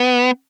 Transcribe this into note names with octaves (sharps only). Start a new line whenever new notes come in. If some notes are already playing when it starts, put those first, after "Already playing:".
Already playing: B3